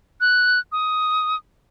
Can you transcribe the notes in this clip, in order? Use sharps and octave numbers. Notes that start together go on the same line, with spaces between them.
F#6
D#6